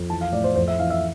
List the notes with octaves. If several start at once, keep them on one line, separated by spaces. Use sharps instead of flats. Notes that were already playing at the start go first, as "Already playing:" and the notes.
Already playing: F2
E3 A5
F5
A2 D5
C5
F2 C5
E5
E3 F5
E5